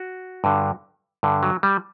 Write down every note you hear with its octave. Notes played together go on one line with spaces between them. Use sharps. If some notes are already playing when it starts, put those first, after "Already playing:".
Already playing: F#4
G2 D3
G2 D3
F#3
G3